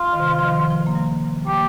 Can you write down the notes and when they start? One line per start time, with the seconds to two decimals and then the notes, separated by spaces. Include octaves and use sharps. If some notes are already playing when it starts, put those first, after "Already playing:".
Already playing: F4
0.13 D#3
0.20 C3
0.39 F3
0.45 D#3
0.70 F3
0.87 A#3
0.95 G3
1.47 A#3 G4